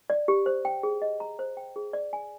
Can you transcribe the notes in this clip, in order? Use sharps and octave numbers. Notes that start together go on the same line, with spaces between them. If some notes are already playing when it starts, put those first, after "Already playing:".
D5
G4
C5
G5
G#4
D#5
A#5
C5
G5
G#4
D5
G#5